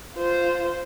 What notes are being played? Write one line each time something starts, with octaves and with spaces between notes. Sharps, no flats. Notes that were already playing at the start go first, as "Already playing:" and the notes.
F4 C5